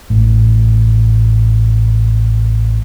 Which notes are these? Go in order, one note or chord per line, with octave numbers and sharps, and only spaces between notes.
A1 A2